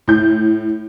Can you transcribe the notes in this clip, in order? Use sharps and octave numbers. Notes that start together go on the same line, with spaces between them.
A2 G6